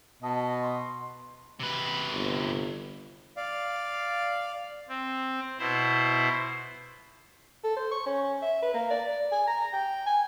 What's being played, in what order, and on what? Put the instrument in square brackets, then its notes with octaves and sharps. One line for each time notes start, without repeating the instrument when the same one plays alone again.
[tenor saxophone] B2 [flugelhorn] D#5 [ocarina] A5
[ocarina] C6
[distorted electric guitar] C3 B4
[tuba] G1
[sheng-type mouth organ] D5 F5
[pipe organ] C4
B2 E4 C5
[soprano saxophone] A4
C5
C#6
C#4
E5
B4
A#3
D5
G#5
A#5
G5
G#5